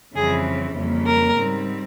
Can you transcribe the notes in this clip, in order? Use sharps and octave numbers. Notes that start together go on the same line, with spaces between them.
F2 C#3 E3 G3 C4 G#4
F2 C#3 G3 A#3
A#4
G#2 G3 C4